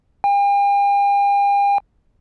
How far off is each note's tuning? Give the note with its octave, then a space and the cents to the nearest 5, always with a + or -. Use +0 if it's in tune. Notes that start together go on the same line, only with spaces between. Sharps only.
G5 +45